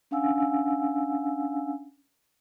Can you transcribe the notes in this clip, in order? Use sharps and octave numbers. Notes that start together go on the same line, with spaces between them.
C#4 D4 F5 F#5 G#5 E6